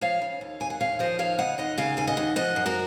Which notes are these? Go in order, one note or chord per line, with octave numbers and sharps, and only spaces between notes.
F3 C#5 F5
C#3
D#2
D#2 G#5
F#5
D#2 C#5 F5
F3 C5 D#5
D#2 C#5 F5
C#3 D#5 F#5
D#2 D#5 F#5
C#3 F5 G#5
D#2 G#5
D#5 F#5
D#2
F3 D#5 F#5
F#2
F#4 A#4